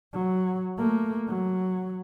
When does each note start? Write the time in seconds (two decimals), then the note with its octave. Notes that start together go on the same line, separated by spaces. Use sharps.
0.13 F#3
0.77 A3 A#3
1.28 F#3